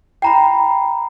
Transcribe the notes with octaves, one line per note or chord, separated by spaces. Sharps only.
G5 A#5 B5